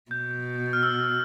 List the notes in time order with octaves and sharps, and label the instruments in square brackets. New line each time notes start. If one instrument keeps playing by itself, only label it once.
[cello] B2 [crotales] G6
[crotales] F6
E6